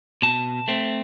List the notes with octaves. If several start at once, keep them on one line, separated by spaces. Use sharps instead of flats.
B2 A5
A3 C4